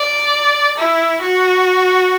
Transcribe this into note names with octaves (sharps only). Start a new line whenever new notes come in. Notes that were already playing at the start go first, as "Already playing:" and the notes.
Already playing: D5
E4
F#4